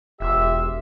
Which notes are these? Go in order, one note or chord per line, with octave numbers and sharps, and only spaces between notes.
E1 F4 G4 E5